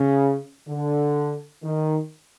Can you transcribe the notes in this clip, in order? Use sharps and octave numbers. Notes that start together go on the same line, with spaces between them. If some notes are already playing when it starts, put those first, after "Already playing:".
Already playing: C#3
D3
D#3